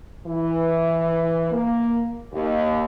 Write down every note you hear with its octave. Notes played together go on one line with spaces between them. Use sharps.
E3
A#3
D#2